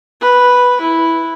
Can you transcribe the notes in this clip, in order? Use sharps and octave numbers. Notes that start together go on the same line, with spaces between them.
B4
E4